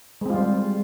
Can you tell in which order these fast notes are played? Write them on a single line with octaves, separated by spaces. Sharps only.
G#3 C4 F4 G3